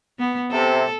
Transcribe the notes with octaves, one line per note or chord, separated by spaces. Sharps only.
B3
C3 A4